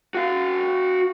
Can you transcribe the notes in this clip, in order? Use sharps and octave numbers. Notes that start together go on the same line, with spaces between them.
F#4 F5